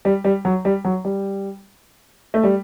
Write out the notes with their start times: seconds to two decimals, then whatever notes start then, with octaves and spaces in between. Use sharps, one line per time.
0.05 G3
0.24 G3
0.45 F#3
0.65 G3
0.85 F#3
1.05 G3
2.34 A3
2.43 G3